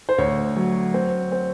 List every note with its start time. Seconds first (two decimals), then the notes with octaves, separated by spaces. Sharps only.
0.09 C5
0.18 D2 C#5
0.57 F#3
0.94 C4
1.32 C4